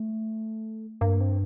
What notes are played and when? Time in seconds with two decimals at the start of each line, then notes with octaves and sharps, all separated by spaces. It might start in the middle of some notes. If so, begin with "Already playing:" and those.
Already playing: A3
1.01 G2 A#3
1.21 C4